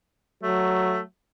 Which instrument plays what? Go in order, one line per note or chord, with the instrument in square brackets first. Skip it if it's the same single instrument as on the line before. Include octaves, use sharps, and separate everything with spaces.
[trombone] F#3 [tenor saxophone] A3